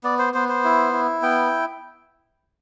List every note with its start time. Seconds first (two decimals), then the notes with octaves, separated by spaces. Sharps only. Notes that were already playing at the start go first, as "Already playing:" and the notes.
0.04 B3 D5
0.19 C5
0.34 B3 C5
0.49 C5
0.64 E4
0.93 E4
1.22 B3 G5